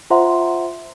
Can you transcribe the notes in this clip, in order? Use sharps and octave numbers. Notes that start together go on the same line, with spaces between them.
F4 C5 E5 F#5 A#5 C6